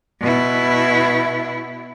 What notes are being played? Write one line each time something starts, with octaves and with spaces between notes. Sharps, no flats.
B2 E4